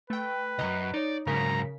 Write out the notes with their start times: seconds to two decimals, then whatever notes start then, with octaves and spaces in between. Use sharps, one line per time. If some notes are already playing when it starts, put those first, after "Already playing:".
0.10 A3 B4 G5
0.59 C#2 F#2 D#5 A#5 F#6
0.94 D#4 C#5 D5
1.27 G#2 C#3 F#3 A#4 A#5 B6